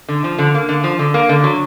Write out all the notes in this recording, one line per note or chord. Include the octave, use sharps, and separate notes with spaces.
D3
F3
D3
A#3
D3
F3
D3
A#3
D3
F#3